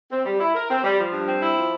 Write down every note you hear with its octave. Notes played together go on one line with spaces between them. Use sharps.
C4
G3
E4
A#4
C4
G3
F3
G2
C4
E4
F3